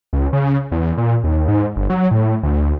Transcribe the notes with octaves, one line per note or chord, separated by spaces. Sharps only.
C#2
C#3
E2
A#2
D#2
G#2
G1
F#3
A2
D2